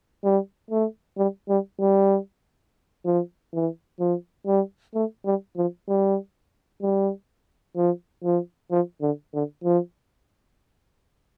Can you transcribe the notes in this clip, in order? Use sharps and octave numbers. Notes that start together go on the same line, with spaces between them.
G3
A3
G3
G3
G3
F3
E3
F3
G3
A3
G3
F3
G3
G3
F3
F3
F3
D3
D3
F3